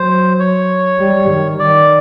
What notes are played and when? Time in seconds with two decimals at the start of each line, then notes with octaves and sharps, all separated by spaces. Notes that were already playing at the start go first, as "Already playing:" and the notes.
Already playing: F#3 C5
0.39 C#5
0.99 G3
1.29 D#3
1.59 D#3 D5